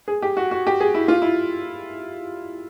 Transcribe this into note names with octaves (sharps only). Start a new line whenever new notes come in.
G#4
G4
F#4
F#4
G4
G#4
E4
F4
E4